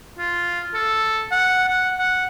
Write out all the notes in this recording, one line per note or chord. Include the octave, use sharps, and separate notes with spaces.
F4
A4
F#5
F#5
F#5